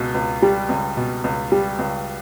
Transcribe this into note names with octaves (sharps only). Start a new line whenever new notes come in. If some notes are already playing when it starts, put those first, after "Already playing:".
Already playing: C#2 B2
C#2
G3
C#2
B2
C#2
G3
C#2